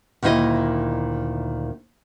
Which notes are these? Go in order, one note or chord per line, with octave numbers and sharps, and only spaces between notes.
D2 A#2 D#3 E4 D#5